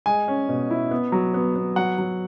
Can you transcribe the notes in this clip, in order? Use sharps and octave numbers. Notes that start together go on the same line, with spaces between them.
G#3 G#5
C#4
B2
E4
B3
F#3
B3
B3
F#3 F#5
F#3